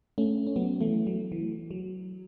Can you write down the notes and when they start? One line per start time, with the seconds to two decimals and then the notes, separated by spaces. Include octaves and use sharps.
0.18 A3 C#4
0.47 C#4
0.56 F#3 B3
0.81 E3 A3
1.07 F#3
1.32 E3
1.71 F#3